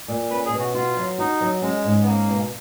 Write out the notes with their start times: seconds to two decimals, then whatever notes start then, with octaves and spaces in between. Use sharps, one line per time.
0.08 A#2
0.30 C#4 B4
0.46 G#4
0.53 B2
0.60 F#4
0.74 F4 F#4
0.97 F#3
1.18 D#4 F#4
1.41 F#3
1.62 G#3 C#4
1.84 G#2
2.02 B3
2.06 A#3 C#4
2.29 B2